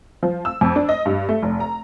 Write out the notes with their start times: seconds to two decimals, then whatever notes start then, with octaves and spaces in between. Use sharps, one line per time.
0.23 F3
0.45 E6
0.61 F2
0.76 D4
0.89 D#5
1.05 G2
1.29 A3
1.42 F1
1.60 A#5